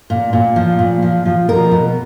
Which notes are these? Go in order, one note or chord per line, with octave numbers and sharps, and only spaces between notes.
A#2
A#2
F3
A#2
F3
F3
B2 A#4
B2